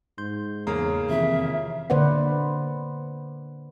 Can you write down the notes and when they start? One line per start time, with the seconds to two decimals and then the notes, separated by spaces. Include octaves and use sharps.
0.18 G#2 C6 G6
0.67 E2 C#3 A#3 A#5
1.09 F2 C3 D#3 E3 E5
1.90 D3 A#3 B4 C5 D5 F#5